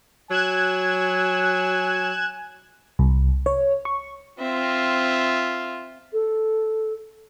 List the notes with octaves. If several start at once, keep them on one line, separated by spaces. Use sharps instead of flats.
F#3 G#5 F#6 G#6 E7
C2
C#5
C#6
C4 F4 E5
A4